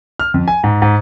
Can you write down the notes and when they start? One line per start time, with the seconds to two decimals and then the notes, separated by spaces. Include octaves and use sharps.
0.20 F6
0.34 F2
0.48 G#5
0.64 G#2
0.82 G#2